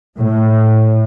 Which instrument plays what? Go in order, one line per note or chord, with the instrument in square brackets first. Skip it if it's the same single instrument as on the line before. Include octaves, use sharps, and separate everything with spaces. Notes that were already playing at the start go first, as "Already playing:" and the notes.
[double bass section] A2